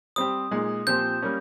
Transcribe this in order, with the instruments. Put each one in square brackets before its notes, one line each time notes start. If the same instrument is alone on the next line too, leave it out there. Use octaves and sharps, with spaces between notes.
[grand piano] G3 C4 G4 [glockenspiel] D#6
[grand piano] A#2 G#3 D#4 G#4
[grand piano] A#2 F3 C4 G4 C5 [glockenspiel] G6
[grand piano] G3 A#3 C#4